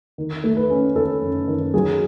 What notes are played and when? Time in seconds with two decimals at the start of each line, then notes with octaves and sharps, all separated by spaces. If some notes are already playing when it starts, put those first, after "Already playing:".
0.18 D#3
0.44 A3
0.57 B4
0.70 C#4
0.96 D#3 A4
1.22 F#2
1.48 D#3
1.74 F#3 G#4